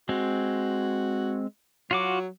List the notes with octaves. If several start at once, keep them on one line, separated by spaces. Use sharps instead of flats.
G#3 C4 F#4
F#3 F4 F#4 D6